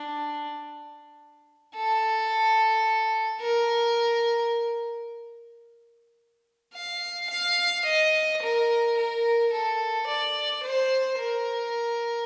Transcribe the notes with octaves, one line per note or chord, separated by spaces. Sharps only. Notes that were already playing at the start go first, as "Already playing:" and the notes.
Already playing: D4
A4
A#4
F5
F5
D#5
A#4
A#4
A4
D5
C5
A#4